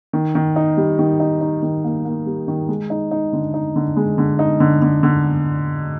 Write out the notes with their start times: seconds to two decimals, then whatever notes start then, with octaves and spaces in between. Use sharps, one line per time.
0.13 D#3
0.35 D#3
0.56 D#4
0.77 G3
0.99 D#3
1.20 D#4
1.41 D#4
1.62 D#3
1.84 A#3
2.05 A#3
2.26 G3
2.48 D#3
2.68 G#3
2.90 D#4
3.11 D#4
3.33 D3
3.54 D#4
3.76 D3
3.97 G#3
4.18 D3
4.39 D#4
4.60 D3
4.82 D3
5.03 D3